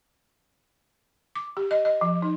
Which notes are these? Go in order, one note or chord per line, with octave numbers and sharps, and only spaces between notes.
D6
G4
D#5
D#5
F3
D#4